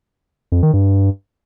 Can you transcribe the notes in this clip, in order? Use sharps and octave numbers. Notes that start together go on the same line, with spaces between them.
F2
D#3
G2